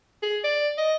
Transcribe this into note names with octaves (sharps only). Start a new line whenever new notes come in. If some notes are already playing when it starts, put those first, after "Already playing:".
G#4
D5
D#5